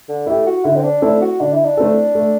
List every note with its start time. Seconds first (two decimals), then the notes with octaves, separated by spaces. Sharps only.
0.09 D3
0.27 A3 E4 G4
0.46 F#4
0.64 D3 E4
0.76 C4
0.84 D4
1.02 A3 C4 D4 E4 A4
1.21 F#4
1.40 D3 D4
1.52 E4
1.64 D4
1.77 A3 C4 E4 A4
2.15 A3